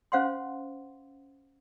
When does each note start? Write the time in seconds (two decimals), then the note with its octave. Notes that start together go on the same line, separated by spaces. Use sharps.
0.12 C#4 C5 F5 F#5 G#5 C6